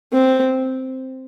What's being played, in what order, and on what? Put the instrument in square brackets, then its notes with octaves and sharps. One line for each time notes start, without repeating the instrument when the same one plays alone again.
[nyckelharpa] C4